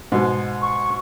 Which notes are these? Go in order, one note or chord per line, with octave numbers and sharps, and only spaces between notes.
G#2 B2
C#6